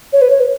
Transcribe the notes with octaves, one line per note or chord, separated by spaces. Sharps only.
C#5
B4
C#5
B4